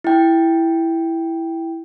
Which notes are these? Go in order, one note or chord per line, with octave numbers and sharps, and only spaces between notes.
E4 G5